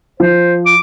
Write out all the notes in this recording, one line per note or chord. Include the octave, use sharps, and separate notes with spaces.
F3 C5
D6